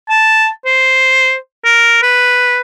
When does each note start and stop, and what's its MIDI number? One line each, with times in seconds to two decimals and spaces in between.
0.10 0.49 81
0.66 1.36 72
1.65 1.99 70
2.03 2.61 71